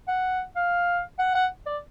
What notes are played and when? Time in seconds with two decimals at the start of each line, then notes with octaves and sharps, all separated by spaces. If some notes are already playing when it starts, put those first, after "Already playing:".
0.08 F#5
0.56 F5
1.19 F#5
1.35 F#5
1.66 D5